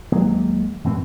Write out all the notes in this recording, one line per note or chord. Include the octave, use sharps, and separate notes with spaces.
D#2 F#3 G#3 A#3
F#2 A2 E3 C4